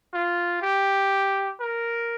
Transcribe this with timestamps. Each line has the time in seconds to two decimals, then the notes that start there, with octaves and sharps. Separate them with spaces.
0.14 F4
0.62 G4
1.61 A#4